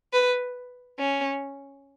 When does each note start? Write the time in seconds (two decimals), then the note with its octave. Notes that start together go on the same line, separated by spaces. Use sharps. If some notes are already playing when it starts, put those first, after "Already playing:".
0.13 B4
0.99 C#4